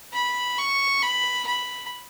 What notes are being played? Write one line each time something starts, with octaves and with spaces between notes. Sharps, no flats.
B5
C#6
B5
B5